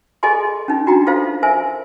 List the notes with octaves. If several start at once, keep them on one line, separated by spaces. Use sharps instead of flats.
G#4 A4 D#5 G#5 C6
C#4 D#4
D4 F#4 G5 A#5
D#4 F4 A4 C5 F5
A#4 C5 E5 G#5